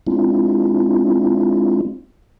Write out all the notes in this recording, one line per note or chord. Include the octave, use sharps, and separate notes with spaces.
G#3 C4 D4 E4 F4